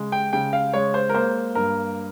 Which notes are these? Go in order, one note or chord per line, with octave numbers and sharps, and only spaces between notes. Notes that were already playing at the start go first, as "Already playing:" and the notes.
Already playing: C#3 G#3
G5
C#3 G5
F5
G#3 C#5
C5
A#4
A#3 C5
G2 A#4